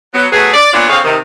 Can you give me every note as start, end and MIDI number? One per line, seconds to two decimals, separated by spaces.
0.14 0.26 54
0.14 0.26 59
0.32 0.53 54
0.32 0.53 57
0.32 0.53 59
0.32 0.53 68
0.54 0.72 74
0.73 0.87 46
0.73 0.87 59
0.73 0.87 62
0.73 0.87 65
0.73 0.87 73
0.73 0.87 74
0.89 0.99 50
0.89 0.99 60
0.89 0.99 68
0.89 0.99 73
0.89 0.99 77
1.04 1.16 48
1.04 1.16 51